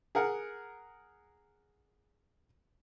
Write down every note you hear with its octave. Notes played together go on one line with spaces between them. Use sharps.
G#4 A#4 F#5